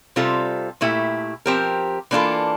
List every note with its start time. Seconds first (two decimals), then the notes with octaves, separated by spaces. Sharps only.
0.16 C3 G3 C4 F4 A4
0.81 A#2 A3 E4 G4
1.46 F3 C4 G4 A#4
2.11 E3 A#3 D4 F4 A4